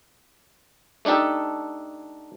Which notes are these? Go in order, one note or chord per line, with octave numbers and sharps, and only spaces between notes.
A3 D4 D#4 G4 A4